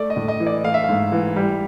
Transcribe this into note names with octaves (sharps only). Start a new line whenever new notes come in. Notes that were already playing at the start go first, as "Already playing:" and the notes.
Already playing: A3 D5
D#5
A2
D#5
E3
D5
A3 F5
E5
G#2 F5
E3
G3